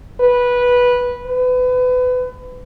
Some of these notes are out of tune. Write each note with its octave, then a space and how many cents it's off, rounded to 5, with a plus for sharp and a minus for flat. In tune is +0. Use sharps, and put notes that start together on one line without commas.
B4 -10
B4 +30